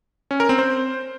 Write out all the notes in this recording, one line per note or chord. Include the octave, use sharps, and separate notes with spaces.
C#4
A#4
C4
C5